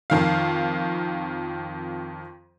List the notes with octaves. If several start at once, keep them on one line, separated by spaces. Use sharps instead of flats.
F2 D#3 F5